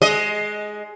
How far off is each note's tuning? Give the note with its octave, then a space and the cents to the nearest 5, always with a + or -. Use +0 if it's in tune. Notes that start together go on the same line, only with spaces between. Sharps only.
G#3 +15 D#5 +5